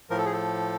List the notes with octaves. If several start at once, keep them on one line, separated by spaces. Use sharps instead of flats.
A2 F3 A#4
A4
G#4
A4